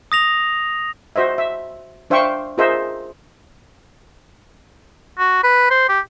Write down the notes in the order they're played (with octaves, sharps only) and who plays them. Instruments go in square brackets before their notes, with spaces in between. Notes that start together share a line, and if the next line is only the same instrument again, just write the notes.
[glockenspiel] D#6 A#6 F7
[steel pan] F#4 C5 D#5 E5
E5
D4 C5 E5 F5 G5 C#6
F4 G#4 A#4 C5 D#5 E5
[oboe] F#4
B4
C5
G4